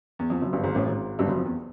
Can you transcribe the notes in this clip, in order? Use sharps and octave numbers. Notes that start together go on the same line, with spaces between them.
E2
F2
F#1 F#2
G1 G2
G#1 G#2
A1 A2
G#1 G#2
G1 G2
F#1 F#2
F2
E2